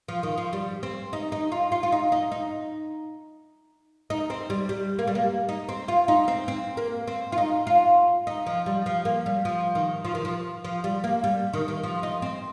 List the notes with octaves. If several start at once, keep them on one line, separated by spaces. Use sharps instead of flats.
F3
D#3
F3
G3
C4
D#4
D#4
F4
F4
F4
D#4
D#4
D#4
D#4
C4
G3
G3
A#3
G3
A#3
D#4
C4
F4
D#4
C4
C4
A#3
C4
F4
D#4
F4
D#4
F3
G3
F3
A#3
G3
F3
D#3
F3
D#3
F3
F3
G3
A#3
G3
D#3
D#3
F3
D#4
C4